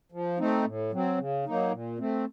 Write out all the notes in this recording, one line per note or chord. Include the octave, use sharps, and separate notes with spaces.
F3
A3 C4 D#4
A2
F#3 C4
C#3
F#3 A#3 D#4
A#2
A3 C4